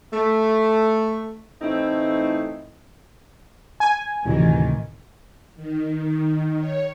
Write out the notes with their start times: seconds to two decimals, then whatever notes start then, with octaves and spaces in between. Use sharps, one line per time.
0.13 A3
1.61 A2 E3 A3 C4 D#4 E4
3.80 G#5
4.25 D2 A2 C3 D#3 E3
5.56 D#3
6.59 C#5